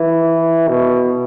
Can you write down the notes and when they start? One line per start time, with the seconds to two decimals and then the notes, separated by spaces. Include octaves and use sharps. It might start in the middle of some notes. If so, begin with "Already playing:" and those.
Already playing: E3
0.68 B2